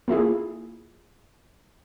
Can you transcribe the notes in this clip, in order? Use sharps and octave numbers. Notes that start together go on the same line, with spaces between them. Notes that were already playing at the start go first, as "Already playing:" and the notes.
A#3 E4 F4 G#4